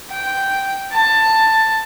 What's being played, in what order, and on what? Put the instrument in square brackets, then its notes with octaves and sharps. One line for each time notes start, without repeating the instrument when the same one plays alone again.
[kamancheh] G5
A5